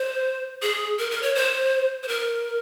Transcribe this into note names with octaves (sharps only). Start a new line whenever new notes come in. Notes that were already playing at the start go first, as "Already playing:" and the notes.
Already playing: C5
G#4
A#4
A#4
C#5
C5
C5
A#4